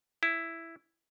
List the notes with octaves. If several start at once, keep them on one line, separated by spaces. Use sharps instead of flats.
E4